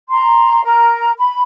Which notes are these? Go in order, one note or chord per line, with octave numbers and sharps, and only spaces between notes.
A#5 C6
A#4 A#5
B5